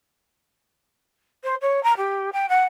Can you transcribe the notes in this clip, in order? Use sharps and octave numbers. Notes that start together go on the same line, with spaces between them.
C5
C#5
A#5
G4
G5
F#5